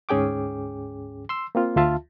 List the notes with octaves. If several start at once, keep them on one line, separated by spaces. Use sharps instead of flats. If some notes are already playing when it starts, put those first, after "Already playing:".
D2 G#2 C#4 G#4 G5 D6
C6 E6
A#3 C4 F4
D2 F4 E5 A5